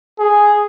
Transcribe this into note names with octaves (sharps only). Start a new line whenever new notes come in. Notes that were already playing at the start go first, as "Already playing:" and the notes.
G#4